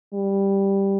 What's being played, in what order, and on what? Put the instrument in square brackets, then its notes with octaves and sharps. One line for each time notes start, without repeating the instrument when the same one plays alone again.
[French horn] G3